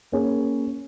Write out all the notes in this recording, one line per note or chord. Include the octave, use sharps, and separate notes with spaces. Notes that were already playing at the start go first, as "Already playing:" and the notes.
A#3 C#4 G#4